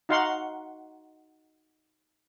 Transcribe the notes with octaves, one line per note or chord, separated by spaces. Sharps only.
D#4 F#4 F5 F#5 C6